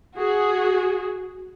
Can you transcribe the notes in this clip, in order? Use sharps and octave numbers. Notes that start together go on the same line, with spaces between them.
F#4 G#4